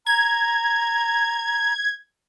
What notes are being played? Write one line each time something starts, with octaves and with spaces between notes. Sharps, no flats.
A#5 G#6